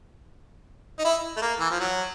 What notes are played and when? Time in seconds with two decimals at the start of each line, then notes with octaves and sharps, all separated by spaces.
0.99 D#4
1.05 E4
1.37 A3
1.42 A#3
1.59 E3
1.70 F3
1.80 F#3